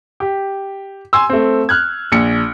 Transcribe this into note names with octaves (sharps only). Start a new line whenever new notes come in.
G4
G#5 C6 E6
A3 C4
F6 F#6 G#6
A#1 C#7